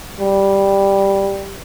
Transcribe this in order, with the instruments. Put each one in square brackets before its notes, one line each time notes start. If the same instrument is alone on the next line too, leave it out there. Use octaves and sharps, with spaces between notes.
[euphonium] G3